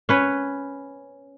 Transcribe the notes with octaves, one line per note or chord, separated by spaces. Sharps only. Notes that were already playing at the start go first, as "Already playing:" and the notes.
C#4 B4 C#5